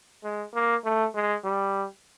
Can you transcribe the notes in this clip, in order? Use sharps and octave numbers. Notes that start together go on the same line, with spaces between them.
G#3
A#3
A3
G#3
G3